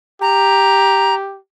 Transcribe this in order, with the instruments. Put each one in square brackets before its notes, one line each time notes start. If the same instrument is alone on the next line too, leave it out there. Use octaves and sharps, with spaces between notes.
[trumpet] G4 [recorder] A#5